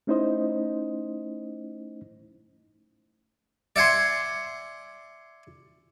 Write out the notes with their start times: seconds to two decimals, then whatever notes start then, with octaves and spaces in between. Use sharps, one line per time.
0.07 A3 C#4 D#4 E4 C5 D#5
3.76 D5 E5 F#5 G#5 C6